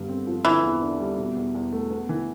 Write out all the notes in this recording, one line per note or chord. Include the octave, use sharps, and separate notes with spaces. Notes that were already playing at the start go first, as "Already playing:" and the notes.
Already playing: G2 D3 B3
C4
F3
D3 E3
E2
D4
G3
B2
E2
E2
A3
B3
E3